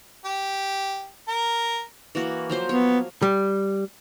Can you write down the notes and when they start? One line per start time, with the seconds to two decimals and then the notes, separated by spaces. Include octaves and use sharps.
0.25 G4
1.28 A#4
2.15 E3 A#3 F#4
2.49 F3 F#3 C5
2.69 B3 C#5
3.22 G3